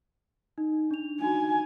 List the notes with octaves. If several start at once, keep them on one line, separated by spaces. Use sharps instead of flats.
D#4
D4 F7
D#4 F#4 G#5